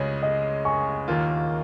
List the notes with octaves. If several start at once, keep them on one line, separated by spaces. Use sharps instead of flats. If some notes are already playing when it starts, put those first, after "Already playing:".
Already playing: C#2 C#3 G#3 C#4 G#4 C#5 D#5
D#5
G#5 C#6
D#2 D#3 A#3 F4